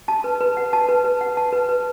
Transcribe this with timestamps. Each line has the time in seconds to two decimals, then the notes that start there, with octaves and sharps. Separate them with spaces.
0.08 A5
0.24 B4
0.41 B4
0.57 F#5
0.73 A5
0.89 B4
1.04 B4
1.21 F#5
1.37 A5
1.52 B4
1.69 B4